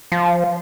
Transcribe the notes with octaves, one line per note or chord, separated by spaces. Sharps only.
F3